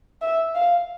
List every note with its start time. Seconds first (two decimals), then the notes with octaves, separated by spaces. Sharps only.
0.22 E5
0.55 F5